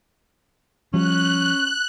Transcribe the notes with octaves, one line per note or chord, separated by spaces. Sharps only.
F3 G3 C#4 F#6